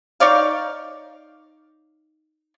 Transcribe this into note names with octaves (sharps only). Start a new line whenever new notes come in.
D#4 C#5 D5 F5